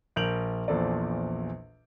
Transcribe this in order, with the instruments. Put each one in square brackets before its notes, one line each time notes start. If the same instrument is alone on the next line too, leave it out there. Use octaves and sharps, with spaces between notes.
[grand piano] A#1 A#4 G6 D7 F7 F#7
A#1 E2 A#2 A4 C5 D5